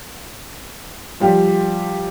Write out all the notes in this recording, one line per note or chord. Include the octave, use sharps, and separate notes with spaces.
F3 G3 G4